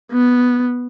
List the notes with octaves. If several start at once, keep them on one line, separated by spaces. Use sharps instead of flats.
B3